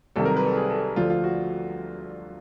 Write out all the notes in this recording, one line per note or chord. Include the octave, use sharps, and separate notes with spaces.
C2 C3 D#3 F#3 A4
A#4
B4
A4
G#4
A4
D2 D3 F3 F4
F4
F#4